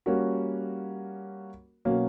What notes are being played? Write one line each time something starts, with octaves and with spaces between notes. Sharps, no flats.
G3 A#3 C#4 F#4 A#4
B2 F#3 A#3 C#4